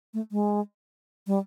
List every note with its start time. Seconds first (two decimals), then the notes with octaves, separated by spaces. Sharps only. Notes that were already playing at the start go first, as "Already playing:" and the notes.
0.14 A3
0.32 G#3
1.27 G3